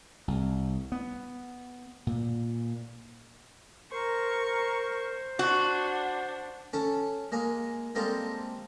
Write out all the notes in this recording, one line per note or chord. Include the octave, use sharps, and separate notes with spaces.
C2
B3
A#2
A#4 C5 C#6
D4 F#4 F#5
C#4 A4
G#3 A#3 G#5
G3 G#3 A#3 C4 A4